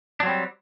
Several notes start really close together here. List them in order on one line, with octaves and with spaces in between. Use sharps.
D4 F#3 C4 G3